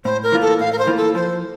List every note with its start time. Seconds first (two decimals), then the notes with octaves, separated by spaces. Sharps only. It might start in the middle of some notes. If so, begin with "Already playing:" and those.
0.05 A2 C5
0.23 A#4
0.32 E3 A#3 F4
0.41 A4
0.60 A2 F5
0.73 A#4
0.79 C5
0.87 E3 A#3 F4
0.97 A4
1.15 F3 C5